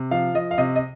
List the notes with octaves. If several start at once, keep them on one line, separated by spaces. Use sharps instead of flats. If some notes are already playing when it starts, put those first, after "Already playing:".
Already playing: C3
F3 F5
F3 D#5
F5
C3 D#5
D#5